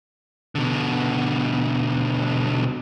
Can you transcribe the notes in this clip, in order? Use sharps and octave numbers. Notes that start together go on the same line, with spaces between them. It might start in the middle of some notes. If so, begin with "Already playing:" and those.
B2 D3